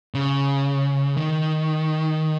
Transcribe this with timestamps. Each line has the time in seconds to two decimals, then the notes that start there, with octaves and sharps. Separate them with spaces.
0.15 C#3
1.17 D#3